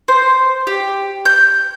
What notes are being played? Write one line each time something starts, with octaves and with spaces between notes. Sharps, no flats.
C5
G4
G6